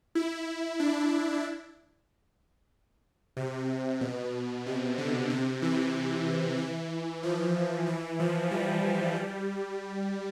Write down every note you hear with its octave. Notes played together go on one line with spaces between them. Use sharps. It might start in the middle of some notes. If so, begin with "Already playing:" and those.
E4
D4
C3
B2
C3
D3
C3
E3
E3
F3
E3
F3
G3
G3